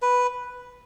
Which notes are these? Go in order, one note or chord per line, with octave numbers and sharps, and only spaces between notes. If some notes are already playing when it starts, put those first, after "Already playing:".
B4